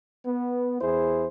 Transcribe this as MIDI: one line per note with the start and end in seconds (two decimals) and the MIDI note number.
0.26 0.78 59
0.81 1.27 40
0.81 1.27 64
0.81 1.27 68
0.81 1.27 72